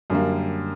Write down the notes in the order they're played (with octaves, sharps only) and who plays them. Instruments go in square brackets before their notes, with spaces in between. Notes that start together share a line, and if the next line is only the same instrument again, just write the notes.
[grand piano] F#2 D3 G3 A#3